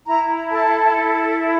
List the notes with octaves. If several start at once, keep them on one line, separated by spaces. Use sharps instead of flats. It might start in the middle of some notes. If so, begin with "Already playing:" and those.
E4 A#5
A4 A5
E4
A4